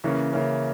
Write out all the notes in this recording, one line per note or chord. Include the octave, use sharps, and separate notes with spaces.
C#3 E3 A#3 C#4
C#3 E3 A#3 C#4